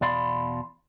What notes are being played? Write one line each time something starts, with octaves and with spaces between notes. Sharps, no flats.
E2 B2 D5 F5 B5 C6